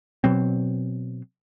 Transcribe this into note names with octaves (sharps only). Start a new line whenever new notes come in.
B2 F#3 C4